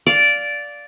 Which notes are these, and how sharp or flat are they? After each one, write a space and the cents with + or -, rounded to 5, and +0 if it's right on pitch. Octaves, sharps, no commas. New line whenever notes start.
D5 -10 F5 +5